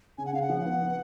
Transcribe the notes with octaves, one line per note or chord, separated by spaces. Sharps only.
C#3 G#5
F#5
C#3 F5
F#5
F3
B3
B3